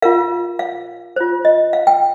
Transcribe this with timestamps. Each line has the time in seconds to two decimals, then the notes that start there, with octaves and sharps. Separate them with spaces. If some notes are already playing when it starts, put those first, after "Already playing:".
0.02 F4 A#4 F5
0.59 F5
1.16 F4 C5
1.45 D#5
1.73 F5
1.87 G5